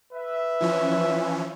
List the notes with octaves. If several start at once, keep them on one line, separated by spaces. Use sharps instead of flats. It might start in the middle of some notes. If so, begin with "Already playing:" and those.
B4 E5
E3 F3 C#4